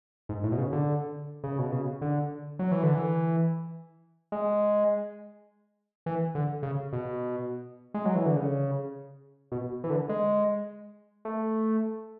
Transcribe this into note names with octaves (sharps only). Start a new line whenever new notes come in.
G#2
A2
B2
C#3
D3
C#3
B2
C#3
D3
F#3
E3
D3
E3
G#3
E3
D3
C#3
B2
G#3
F#3
E3
D3
C#3
B2
E3
D3
G#3
A3